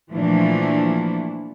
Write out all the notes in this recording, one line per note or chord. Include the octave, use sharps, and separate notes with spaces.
A#2 E3 F3 A3 D4